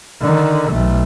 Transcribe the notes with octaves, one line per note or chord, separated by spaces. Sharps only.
D3 D#3
B1 A3